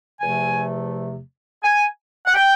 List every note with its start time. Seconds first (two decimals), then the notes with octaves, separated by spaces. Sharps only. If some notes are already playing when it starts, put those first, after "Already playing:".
0.20 E2 C3 F3 A3 G#5
1.63 G#5
2.26 F#5
2.34 G5